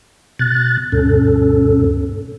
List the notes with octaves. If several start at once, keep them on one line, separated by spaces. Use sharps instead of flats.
B2 F#6 A6
D2 G2 B2 C#4 A4